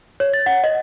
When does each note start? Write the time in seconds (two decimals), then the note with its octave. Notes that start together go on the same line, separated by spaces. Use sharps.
0.20 C#5
0.34 A6
0.46 F#5
0.64 D#5